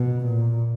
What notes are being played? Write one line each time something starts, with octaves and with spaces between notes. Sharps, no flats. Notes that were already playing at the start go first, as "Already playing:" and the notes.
Already playing: B2
A#2